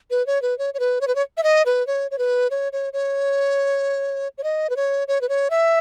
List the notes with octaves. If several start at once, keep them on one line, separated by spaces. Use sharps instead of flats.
B4
C#5
B4
C#5
C#5
B4
C#5
B4
C#5
E5
D#5
B4
C#5
C#5
B4
C#5
C#5
C#5
C#5
D#5
B4
C#5
C#5
B4
C#5
E5